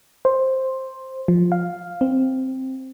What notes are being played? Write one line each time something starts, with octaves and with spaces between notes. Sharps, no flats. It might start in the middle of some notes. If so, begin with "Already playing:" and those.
C5
F3
F5
C4